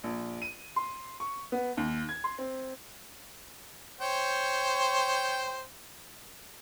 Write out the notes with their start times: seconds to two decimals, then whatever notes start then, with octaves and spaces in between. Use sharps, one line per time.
0.03 A#1
0.42 D#7
0.76 C6
1.20 C#6
1.52 B3
1.77 D#2
2.09 G#6
2.24 C6
2.38 C4
4.01 C5 C#5 G5